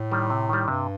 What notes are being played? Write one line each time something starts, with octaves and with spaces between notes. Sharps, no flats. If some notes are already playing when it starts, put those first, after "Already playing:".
Already playing: A2
D#3 G3
C3
D#3 G3
G2 C3